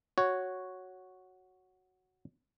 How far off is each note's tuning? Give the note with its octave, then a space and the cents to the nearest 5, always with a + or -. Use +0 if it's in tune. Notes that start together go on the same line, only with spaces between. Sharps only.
F#4 +0 C#5 +0